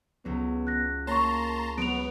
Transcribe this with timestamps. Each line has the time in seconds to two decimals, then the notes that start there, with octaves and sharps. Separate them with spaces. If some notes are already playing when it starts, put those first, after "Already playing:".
0.25 C#2 F#3 B3
0.67 F#6 A#6
1.07 A#3 C#5 A5 A#5 C6 C#6 A#6
1.78 F#3 G#3 B3 D7 F7